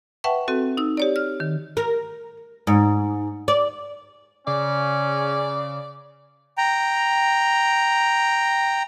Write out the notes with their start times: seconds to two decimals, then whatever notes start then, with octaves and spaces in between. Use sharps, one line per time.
0.24 B4 E5 F#5 G5 A5 C#6
0.48 C4 F#4 A4
0.77 D#4 E6
0.97 G4 C#5 D5
1.16 F6
1.40 D#3
1.77 A#4
2.67 G#2
3.48 D5
4.47 C#3 C#4 D5
6.58 G5 A#5